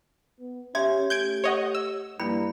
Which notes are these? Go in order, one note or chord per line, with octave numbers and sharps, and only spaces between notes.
B3
C#4 G4 E5 C6 G#6
A3 G6 G#6 D7
C#5 D#5 F#5
E6
G2 A#3 E4 B5